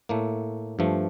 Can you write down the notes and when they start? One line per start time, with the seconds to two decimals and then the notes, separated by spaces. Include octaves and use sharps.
0.09 A2 A3 A#3
0.79 G2 F3 A3